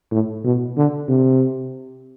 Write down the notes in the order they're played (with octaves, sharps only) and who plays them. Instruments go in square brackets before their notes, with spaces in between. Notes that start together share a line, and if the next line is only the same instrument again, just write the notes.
[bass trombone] A2
B2
D3
C3